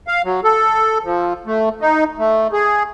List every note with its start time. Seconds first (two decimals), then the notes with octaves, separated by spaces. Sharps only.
0.08 F5
0.25 F#3
0.44 A4
1.04 F3
1.46 A3
1.81 D#4
2.18 A3
2.53 G#4